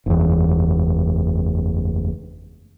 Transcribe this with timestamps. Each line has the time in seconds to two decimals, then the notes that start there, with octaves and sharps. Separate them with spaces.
0.06 F#1 E2